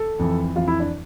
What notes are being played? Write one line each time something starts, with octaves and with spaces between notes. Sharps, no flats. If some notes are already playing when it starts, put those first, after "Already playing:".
Already playing: A4
F2 E3
F2 E3 F4
E4
D4